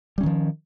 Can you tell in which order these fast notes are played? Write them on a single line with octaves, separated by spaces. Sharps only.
G3 C#4 D#3 F3